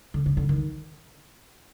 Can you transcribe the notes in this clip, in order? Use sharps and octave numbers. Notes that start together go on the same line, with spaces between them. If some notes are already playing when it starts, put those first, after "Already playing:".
D3
C#3
D3
D#3